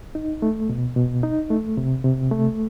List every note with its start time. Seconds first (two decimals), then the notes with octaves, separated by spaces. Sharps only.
0.15 D#4
0.42 A3
0.69 B2
0.97 B2
1.23 D#4
1.50 A3
1.77 C3
2.04 C3
2.31 A3